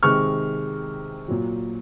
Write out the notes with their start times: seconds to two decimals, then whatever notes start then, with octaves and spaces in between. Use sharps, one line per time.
0.03 C3 D#3 G#3 C#6 F6
1.28 A#2 F#3